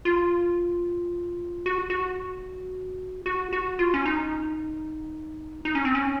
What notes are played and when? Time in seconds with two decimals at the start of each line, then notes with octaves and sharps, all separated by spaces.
0.05 F4
1.66 F#4
1.90 F#4
3.26 F#4
3.53 F#4
3.79 F4
3.94 C#4
4.06 D#4
5.65 D#4
5.75 C#4
5.85 C4
5.95 C#4